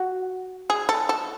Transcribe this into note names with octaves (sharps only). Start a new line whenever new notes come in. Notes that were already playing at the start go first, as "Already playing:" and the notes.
Already playing: F#4
G#4
A4
A4